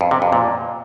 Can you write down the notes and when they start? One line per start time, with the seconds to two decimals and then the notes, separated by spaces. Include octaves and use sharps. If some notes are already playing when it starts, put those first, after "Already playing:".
0.01 F2
0.11 C3
0.22 F2
0.33 A#2